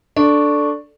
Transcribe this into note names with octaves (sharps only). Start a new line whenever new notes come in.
D4 A4 D5 C#6